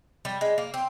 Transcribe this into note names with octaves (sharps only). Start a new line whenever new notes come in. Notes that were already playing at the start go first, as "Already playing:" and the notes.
G3
G#3
A#3
C4